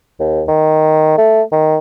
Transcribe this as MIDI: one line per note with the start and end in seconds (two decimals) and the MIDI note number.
0.20 0.43 39
0.48 1.14 51
1.18 1.42 57
1.52 1.78 51